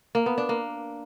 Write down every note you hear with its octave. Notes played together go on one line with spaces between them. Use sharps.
A#3
B3
D4
A#3